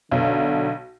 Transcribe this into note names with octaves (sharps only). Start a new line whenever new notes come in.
B1 D3